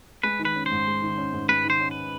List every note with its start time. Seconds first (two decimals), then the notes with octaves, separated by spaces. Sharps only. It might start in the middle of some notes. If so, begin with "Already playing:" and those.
0.23 G#3 B4
0.39 D#3
0.45 B4
0.55 C#4
0.66 C5
0.71 G#2
0.87 G#3
1.02 D#3
1.18 C#4
1.33 G#2
1.49 G#3 B4
1.64 D#3
1.70 C5
1.80 C#4
1.91 B4